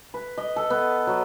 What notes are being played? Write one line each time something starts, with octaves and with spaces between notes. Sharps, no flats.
B4
D#5
A4
B3
F#3